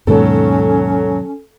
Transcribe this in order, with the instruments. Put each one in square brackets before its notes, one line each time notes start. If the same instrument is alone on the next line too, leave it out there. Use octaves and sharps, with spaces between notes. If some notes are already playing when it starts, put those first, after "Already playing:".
[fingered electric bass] D#2 G#2 B2 [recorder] F#3 [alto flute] C#4 [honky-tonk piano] A4